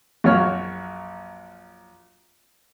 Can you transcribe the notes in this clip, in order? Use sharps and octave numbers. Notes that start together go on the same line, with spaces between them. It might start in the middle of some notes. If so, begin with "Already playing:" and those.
A#1 F#2 F#4 C#5 F6